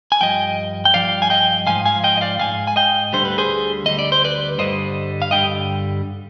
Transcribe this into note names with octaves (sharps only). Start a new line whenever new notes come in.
G#5
G2 F3 D#5 G5
G5
G2 F3 D5 F5
G#5
D#5 G5
G#2 F3 F5 G#5
F5 G#5
D#5 G5
D#5
D5 F5
G#2 F3 F5 G#5
G#5
D#5 G5
D2 D3 G3 C5
B4
G#4 C5
D2 D3 G3 D#5
D5
C5
B4 D5
G2 D3 G3 C5 D#5
F5
G2 D3 G3 D#5 G5